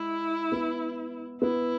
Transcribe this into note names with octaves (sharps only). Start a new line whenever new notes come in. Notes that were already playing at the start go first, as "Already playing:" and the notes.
Already playing: G#3 E4
B3
B3 E4